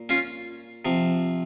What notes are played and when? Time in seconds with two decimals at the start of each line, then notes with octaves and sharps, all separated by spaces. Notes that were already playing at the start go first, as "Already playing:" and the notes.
Already playing: A#2
0.09 C#4 F4
0.85 C3 F3